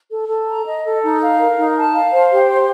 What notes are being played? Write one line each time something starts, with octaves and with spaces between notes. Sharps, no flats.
A4
A4
A#5
D#5
A4
D#4
F5
A#4
D#4
A5
F5
C5
G4
C6